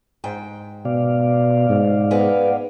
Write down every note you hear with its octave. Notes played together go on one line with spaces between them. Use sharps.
G#2 G5
B2 D5 F5
G#2
G#3 B3